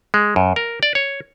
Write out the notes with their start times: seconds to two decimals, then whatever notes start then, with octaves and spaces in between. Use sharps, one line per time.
0.14 G#3
0.36 F#2
0.56 A#4
0.83 D5
0.95 C#5